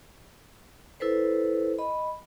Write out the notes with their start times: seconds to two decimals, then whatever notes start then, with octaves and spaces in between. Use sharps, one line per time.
1.00 E4 A4 B4 C5
1.79 D#5 B5